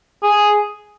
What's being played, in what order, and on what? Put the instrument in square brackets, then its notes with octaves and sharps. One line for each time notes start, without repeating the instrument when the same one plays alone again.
[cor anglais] G#4